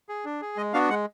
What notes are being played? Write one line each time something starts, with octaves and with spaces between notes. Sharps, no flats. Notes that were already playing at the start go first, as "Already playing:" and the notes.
G#4
D4
G#4
G#3 D#5
B3 D4 F#4 F5
G#3 F#5